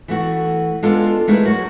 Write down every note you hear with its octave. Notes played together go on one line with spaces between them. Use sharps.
E3 A3 F#4
G#3 B3 D4 F4 A4
G#3 A3 E4 G#4 A#4 B4
F#3 F#4